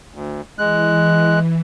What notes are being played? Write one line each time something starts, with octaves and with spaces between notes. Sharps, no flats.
D2
E3 G#3 F#6